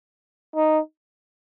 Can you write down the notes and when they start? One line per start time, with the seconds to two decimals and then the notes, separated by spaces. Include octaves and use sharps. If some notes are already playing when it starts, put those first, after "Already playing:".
0.56 D#4